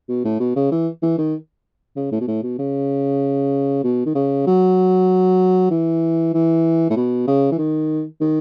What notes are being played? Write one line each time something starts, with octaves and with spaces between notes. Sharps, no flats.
B2
A2
B2
C#3
E3
E3
D#3
C#3
A2
B2
A2
B2
C#3
B2
D#3
C#3
F#3
E3
E3
A2
B2
C#3
E3
D#3
D#3